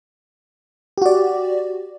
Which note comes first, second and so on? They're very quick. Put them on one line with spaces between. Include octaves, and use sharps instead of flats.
G4 F#4 D5